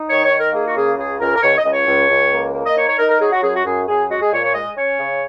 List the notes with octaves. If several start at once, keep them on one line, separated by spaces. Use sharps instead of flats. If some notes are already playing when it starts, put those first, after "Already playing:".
Already playing: D#4
D#3 C#5
C#5
D#4
A#4
A#3 G#4
F#4
C#3 G#4
C#2 G#4
C#2 A#4
A#4
C#2 C#5
D#5
C#2
C#5
C#2
C#2
A#3
A#3
D#5
D#4 C#5
C#5
D#4 A#4
A#4
F#3 G#4
F#4
F#2 G#4
F#4
F#2 G#4
F#2 G#4
G#3 F#4
G#4
A#2 C#5
C#5
G#3 D#5
C#4 C#5
C#3